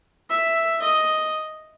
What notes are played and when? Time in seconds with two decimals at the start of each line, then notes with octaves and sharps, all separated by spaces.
0.30 E5
0.82 D#5